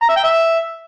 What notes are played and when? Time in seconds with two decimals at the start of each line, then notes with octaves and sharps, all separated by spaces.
0.02 A#5
0.09 E5
0.16 G5
0.24 E5